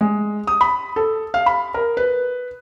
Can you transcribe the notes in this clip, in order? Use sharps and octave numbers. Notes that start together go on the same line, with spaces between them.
G#3
D#6
B5
A4
F5
B5
A#4
B4